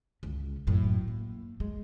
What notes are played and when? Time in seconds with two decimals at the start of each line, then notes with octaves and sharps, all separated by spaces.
0.23 C#2 C#4
0.67 F#2 A2
1.08 A#3
1.60 G#3